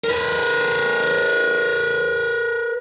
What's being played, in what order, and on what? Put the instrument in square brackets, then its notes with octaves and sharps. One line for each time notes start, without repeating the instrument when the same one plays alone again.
[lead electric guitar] A#4 B4